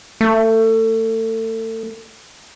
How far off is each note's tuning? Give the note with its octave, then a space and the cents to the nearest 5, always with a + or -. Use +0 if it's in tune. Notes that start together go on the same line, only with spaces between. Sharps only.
A3 +30